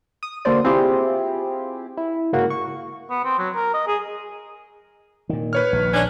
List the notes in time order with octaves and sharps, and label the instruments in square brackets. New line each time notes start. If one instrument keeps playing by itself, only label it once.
[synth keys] D#6
D3 A#3 D4 F#4 C5 D5
C4 E4 F4 G4 G#4
E4
G#2 C#3 A#3 F#4
C#6
[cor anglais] B3
C4
F#3
A#4
D#5
G#4
[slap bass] A#2 D#3
[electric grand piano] B4 C#5 F6
[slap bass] A#1 D#3
[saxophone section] C#4 D4